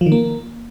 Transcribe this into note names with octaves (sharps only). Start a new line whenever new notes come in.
F3
D#3
A#3